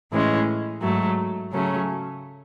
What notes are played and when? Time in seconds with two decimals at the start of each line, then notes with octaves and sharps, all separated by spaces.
0.12 A2 E3 G#3 C#4
0.82 G#2 F#3 A3
1.52 C#3 F#3 A3 C#4